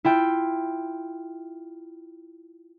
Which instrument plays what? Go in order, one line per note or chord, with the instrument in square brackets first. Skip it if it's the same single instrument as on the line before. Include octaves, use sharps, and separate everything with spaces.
[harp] E4 F4 G5